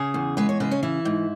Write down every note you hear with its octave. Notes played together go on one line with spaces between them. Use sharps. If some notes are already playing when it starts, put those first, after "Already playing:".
Already playing: C#3 G#4
E2
G#3 B4
C#5
C#3 B4
C#4
E3 E4
G#2